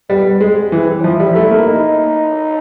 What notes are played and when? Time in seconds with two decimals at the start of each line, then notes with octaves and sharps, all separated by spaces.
0.10 G3 B3
0.41 G#3 C4
0.72 E3
1.04 F3 E4
1.20 G3
1.35 A3
1.51 A#3
1.67 D#4